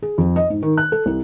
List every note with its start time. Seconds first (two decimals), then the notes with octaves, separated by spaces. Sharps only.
0.02 G#4
0.18 F2
0.36 D#5
0.50 G#2
0.62 D#3
0.78 F#6
0.92 A4
1.06 C2